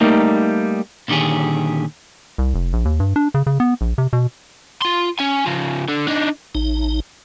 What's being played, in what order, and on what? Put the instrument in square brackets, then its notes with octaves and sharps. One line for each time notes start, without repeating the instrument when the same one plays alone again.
[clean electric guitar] G3 A3 A#3 D#4
A#2 D3 D#3 G4 G#4
[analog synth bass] C2
F1
A#1
D#2
G2
D4
C#3
C#3
B3
A#1
C3
B2
[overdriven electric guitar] F4 C6
C#4 G#5
C#3 F3
D3
D4 D#4
[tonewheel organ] A1 D#4